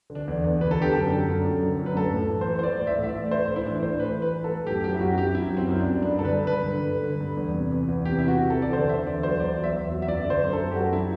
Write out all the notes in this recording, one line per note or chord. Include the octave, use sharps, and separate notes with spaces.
D3
D4
E2
E2
D3 B4
A4
D3 G4
F#2 A4
D3
F#2
F#2
D3
F#2
B4
A2 A4
A2
E3
C5
E3
C5
E3 D5
A2
E5
A2
E5
D5
E3
A2 C5
A2
E4
E3 D4
A2 C5
E3 B4
E3
B4
E3
A4
A2
F#2 G4
F#3 G4
E4
F#2 F#4
F#2 G4
F#2 E4
F#3
C4
F#2 C4
D4
F#2
G2 D4
D3 A4
B4
G2
B4
D3
D3
G2
D3
G2
E2
C3
E3
E2
C3 G4
E4
E3
F#4
C3
A4
E2
D5
D3 C5
D3 E5
E2 D5
F#3 C5
E2 D5
F#3
E5
E2
F#3
E5
F#2 D5
D3
C5
F#2
A4
F#2
G4
F#2 F#4
F#3 E4